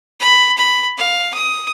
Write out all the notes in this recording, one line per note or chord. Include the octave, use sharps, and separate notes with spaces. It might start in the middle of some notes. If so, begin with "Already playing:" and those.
B5
B5
F5
D#6